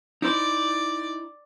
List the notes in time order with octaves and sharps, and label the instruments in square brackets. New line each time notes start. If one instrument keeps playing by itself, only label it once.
[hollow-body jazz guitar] D#4 E4 C5 [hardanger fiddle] D5